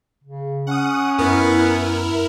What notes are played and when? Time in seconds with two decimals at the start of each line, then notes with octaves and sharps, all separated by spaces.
0.24 C#3
0.67 C#4 F#5 D#6
1.18 F#2 B3 E4 A#4